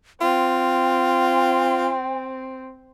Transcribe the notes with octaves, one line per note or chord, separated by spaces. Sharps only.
C4 F4 G5